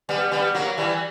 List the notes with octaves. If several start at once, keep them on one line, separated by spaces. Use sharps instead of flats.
G3 B3
G3 B3
F#3 A#3
E3 G3